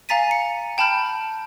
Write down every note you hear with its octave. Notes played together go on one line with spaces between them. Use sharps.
F5 G#5 A#5 A6 B6 D#7
C#7
G5 A5 B5 F6 G6